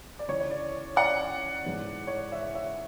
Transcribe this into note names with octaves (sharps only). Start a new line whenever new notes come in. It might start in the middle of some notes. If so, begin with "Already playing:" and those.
D5
C#2 C#3 E3 C#5
C#5
D5
D5 F#5
G#2 E3 G#3 B3
C#5
D5
C#5 E5
C#5 E5